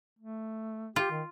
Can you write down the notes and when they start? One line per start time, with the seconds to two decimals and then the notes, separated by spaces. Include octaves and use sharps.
0.19 A3
0.96 F4 G4
1.11 D#3